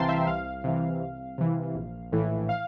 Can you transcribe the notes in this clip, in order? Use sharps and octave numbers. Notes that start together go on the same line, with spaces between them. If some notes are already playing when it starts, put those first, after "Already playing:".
Already playing: C2 C3 E3 F5 G5 A5 A#5 C6
E5
C2 F5
C3 E3
C2
C3 E3
A#1
A2 E3
F5